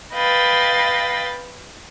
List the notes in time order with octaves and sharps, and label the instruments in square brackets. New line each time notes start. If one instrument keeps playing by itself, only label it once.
[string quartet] B4 D#5 F5 G5 B5 A6